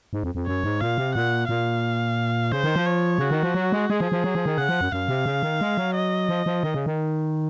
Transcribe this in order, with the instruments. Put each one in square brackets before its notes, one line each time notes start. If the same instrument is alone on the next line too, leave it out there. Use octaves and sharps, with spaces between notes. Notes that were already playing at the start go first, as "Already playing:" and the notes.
[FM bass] G#2
F2
F2
[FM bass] F#2 [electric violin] C#5
[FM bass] G#2
[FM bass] A#2 [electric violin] F5
[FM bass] C3
[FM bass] A#2 [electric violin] F#5
[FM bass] A#2 [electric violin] F5
[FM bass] C#3 [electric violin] C5
[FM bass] D#3
F3
[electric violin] C#5
[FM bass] C#3 [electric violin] F#4
[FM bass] D#3
F3
F#3
G#3
[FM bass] G#3 [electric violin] G#4
[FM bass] F3
F3
F#3
F3
D#3
[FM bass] C#3 [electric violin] F#5
[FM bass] F3
F#2
[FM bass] F#2 [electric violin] F5
[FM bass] C3
C#3
D#3
G#3
F#3
[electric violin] D#5
[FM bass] F3
F3
D#3
C#3
D#3